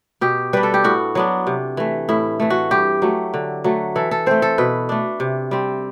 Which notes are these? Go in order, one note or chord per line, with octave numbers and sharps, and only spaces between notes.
B2 G4
G3 D4 B4
A4
G4
A2 F#4
F#3 B3 D4
C3
E3 A3
A2 E4
E3 A3
F#4
G2 G4
F#3 A3
D3
F#3 A3
E3 A4
A4
A3 C4 C5
A4
B2 B4
A3 D4
C3
G3 C4